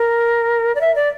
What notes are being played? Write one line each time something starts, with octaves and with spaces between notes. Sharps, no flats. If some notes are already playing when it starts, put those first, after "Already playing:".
Already playing: A#4
D5
E5
D5